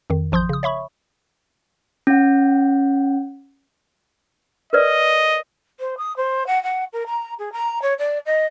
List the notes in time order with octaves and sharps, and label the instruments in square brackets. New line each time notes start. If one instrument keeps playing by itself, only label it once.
[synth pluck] F2 D#3
A1 F3 C6 D#6 G6
C#3 D#6
C#5 E5 B5 C#6
[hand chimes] C#4 F#5
[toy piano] A#4 B4 D5 [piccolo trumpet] D#5
[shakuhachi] C5
D#6
C5
F#5
F#5
A#4
A#5
G#4
A#5
C#5
D5
D#5